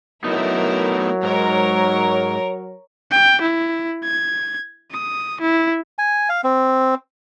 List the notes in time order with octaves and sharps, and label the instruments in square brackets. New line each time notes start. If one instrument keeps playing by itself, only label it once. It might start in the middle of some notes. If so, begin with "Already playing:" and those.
[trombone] F#3 [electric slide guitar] A3 B3 D#4 [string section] E4 A#4
[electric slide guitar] G#2 [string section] A#4 C#5
[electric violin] G5
E4
G#6
D#6
E4
[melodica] G#5
F5
C4